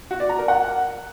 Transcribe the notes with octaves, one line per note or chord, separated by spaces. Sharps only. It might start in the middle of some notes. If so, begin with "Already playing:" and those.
F#4
D5
A#5
A#4
F#5